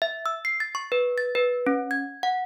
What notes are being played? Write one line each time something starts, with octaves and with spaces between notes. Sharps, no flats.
E5
E6
C7
A6
C#6
B4
A6
B4
C#4
G#6
F#5